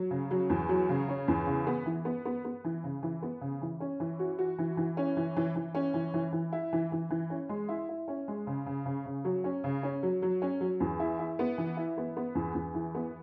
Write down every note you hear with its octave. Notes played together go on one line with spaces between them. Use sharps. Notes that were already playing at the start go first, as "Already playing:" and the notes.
Already playing: F#3
C#3
F#3
E2
F#3
C#3
C#4
E2
C#3
B3
E3
B3
B3
B3
E3
C#3
E3
B3
C#3
E3
C#4
E3
F#4
F#4
E3
E3
C#4
E3
E3
E3
C#4
E3
E3
E3
E4
E3
E3
E3
C#4
G#3
E4
E4
C#4
G#3
C#3
C#3
C#3
C#3
F#3
C#4
C#3
C#4
F#3
F#3
C#4
F#3
E2
E4
E4
B3
E3
E4
B3
B3
E2
E2
E3
B3